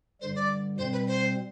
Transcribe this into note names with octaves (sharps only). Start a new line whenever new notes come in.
G2 D3 G3 C5
D5
B2 G3 C4 C5
B4
C5